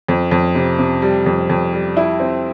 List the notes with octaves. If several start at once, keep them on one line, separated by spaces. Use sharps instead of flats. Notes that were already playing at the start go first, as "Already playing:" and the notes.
F2
F2
C3
C3
G3
F2
F2
G3
E4
C4